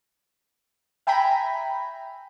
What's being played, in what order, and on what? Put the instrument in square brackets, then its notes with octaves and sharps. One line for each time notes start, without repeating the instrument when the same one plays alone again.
[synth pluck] E5 G5 G#5 A#5 B5